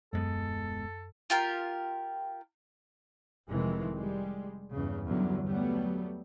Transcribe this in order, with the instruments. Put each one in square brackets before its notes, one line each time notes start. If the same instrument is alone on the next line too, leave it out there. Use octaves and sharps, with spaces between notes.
[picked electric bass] D#1 G#3 B3 [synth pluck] F#2 [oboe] A4
[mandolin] F4 G4 A#4
[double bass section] F1 C3 D#3 E3 G#3
G3 G#3
E2 G2 C#3
E2 G2 D3 F#3 G3
F#3 G3 A3 B3